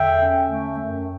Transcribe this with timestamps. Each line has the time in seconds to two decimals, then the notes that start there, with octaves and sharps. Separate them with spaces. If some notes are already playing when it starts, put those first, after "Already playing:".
Already playing: E2 D3 E5 G5
0.19 C#4
0.49 A3
0.79 F#2